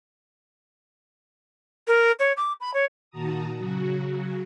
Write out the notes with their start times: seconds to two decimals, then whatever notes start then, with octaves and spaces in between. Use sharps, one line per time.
1.87 A#4
2.19 C#5
2.37 D6
2.60 B5
2.74 C#5
3.11 A#2 D#3 F#4 A5 A#5 D#6
3.57 C#3 F#3 F#4